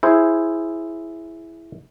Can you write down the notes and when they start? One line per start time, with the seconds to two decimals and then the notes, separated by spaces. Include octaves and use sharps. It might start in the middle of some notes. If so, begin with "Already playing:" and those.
0.03 E4 G#4 C5